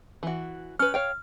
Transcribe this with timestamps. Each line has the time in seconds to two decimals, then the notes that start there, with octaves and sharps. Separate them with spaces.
0.23 E3 F#4
0.79 C#4 B4 F6
0.94 C#5 F5 G5